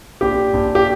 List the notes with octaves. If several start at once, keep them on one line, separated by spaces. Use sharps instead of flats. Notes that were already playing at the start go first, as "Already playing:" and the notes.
A#1 G4
A#1
G4